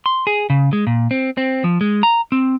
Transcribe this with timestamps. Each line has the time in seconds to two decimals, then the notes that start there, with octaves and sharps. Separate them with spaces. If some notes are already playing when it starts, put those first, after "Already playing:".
0.06 C6
0.27 G#4
0.50 C#3
0.73 G#3
0.87 A#2
1.11 C4
1.37 C4
1.64 F3
1.81 G#3
2.03 A#5
2.32 C4